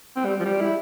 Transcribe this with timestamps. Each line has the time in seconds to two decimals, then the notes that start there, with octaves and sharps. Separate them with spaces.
0.16 C4
0.25 G3
0.40 F3
0.45 G3
0.61 E4